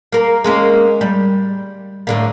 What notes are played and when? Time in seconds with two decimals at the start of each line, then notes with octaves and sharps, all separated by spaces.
0.12 A#3 A#4
0.44 G#3 A#3 C#4
1.01 G3
2.07 A2 D3 A#3